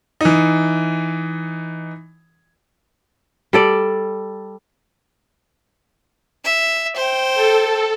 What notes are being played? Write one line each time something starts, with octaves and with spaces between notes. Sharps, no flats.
E3 D#4
G3 A4 D5
E5
C5 G5
A4